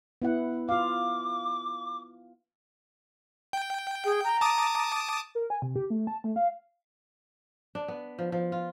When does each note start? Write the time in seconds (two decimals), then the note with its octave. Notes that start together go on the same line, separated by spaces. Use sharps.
0.22 B3 E4 F#5
0.69 F4 F5 D6
3.53 G5
4.05 G#4
4.24 A#5
4.41 A5 D6 D#6
5.35 A#4
5.50 G#5
5.62 C3
5.76 G4
5.90 A3
6.07 A5
6.24 A3
6.36 F5
7.75 D4
7.88 B3
8.19 F3
8.32 F3
8.52 F4